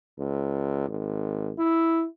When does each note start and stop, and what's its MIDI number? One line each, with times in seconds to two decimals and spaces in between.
0.19 0.86 37
0.88 1.52 32
1.59 2.06 64